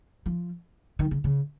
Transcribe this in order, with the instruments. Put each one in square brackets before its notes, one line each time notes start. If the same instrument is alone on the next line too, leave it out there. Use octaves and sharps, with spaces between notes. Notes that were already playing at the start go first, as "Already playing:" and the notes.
[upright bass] F3
D#3
C#3
C#3